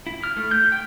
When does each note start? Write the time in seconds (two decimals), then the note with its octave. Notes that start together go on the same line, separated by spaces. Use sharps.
0.07 E4
0.24 F6
0.37 A3
0.51 G6
0.72 G5